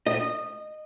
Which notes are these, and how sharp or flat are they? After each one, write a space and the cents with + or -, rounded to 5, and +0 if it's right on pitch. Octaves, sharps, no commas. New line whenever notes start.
D#5 -20